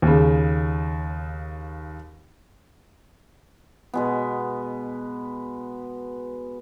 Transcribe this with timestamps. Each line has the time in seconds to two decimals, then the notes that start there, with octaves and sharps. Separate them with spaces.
0.02 D#2 C#3
3.94 B2 G#3 B3